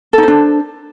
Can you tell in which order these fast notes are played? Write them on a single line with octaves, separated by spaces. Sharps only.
A4 D#4 C5 D4